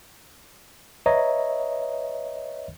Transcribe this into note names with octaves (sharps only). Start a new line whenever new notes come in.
B4 C#5 D#5 E5 A#5